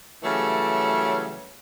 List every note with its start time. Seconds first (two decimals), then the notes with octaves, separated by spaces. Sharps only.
0.23 C#3 E3 F#3 G3 A3